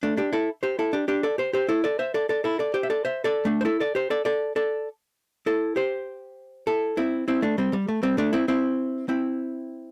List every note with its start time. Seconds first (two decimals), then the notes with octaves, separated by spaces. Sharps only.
0.03 A3 D4
0.17 D4 G4
0.33 E4 A4
0.63 G4 C5
0.79 E4 A4
0.93 D4 G4
1.08 D4 G4
1.23 A4 D5
1.38 G4 C5
1.53 G4 C5
1.69 E4 A4
1.84 A4 D5
1.99 C5 E5
2.14 A4 D5
2.29 A4 D5
2.44 E4 A4
2.59 A4 D5
2.74 G4 C5
2.83 E5
2.90 A4 D5
3.05 C5 E5
3.24 A4 D5
3.45 A3 D4
3.61 C5
3.65 E4 A4
3.80 A4 D5
3.95 G4 C5
4.10 A4 D5
4.25 A4 D5
4.56 A4 D5
5.46 E4 A4
5.76 G4 C5
6.67 E4 A4
6.97 C4 E4
7.28 C4 E4
7.42 A3 D4
7.58 G3 C4
7.73 G3
7.88 A3
8.03 G3 C4
8.18 A3 D4
8.33 C4 E4
8.48 C4 E4
9.09 C4 E4